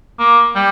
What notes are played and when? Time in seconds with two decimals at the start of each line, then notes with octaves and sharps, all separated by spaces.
0.19 A#3
0.56 G3